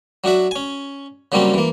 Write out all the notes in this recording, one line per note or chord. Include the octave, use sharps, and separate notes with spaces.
F#3 D4 F#4 E5
C#4 G#5
C#3 F#3 G3 A#3 C4 C#4
E3 A#3